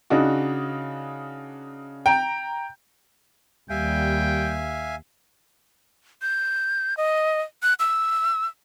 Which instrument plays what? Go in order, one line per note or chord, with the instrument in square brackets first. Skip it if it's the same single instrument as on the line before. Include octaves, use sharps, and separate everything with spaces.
[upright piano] C#3 D4 D#4 F#4
G5 A#5
[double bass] D#2 [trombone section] G3 [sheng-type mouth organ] E5 F5 G#5 [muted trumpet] G5
[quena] G6
D#5
F#6
E6